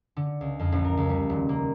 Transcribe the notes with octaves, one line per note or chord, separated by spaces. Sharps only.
D3
C#2
F2
A1
A#4
C#2
G3
D#1
A#3